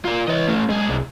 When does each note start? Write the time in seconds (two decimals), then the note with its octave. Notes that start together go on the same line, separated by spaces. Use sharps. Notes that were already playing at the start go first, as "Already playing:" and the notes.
0.05 F4 A#4
0.28 E3 C#5 D#5
0.48 A3 C#4
0.69 B1 G#3 G#4
0.90 C2